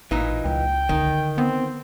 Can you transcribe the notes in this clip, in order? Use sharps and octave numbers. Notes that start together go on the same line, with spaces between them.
A1 A#2 E3 D#4
C#2 G5
D3 D#3
B3 C4